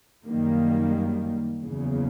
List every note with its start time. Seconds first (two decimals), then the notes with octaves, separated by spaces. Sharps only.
0.25 F#2 D#3 G3 A#3
1.62 F#1 E2 C#3